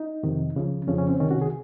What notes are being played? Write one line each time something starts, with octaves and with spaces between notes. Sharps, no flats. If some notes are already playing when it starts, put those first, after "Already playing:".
Already playing: D#4
F2 C3 D#3
C#2 C#3 F3
F2 C#3 F3 C#4
C#4
C4
C2 C3 D#3 C#4
F#4
G#4